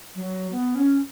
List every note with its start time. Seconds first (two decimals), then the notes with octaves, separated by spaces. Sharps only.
0.15 F#3
0.52 B3
0.75 C#4